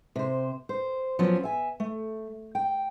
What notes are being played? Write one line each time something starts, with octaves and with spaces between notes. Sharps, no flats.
C3 C5
C5
F3 F#3 B3 C#4
E5 G#5
A3
G5